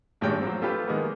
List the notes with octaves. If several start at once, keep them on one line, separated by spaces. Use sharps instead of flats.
G#1 G2 G#3 D4 C#5 G5
F3 F#3 C4
A3 F4 G4 B4
D#3 G#3 A#3 B3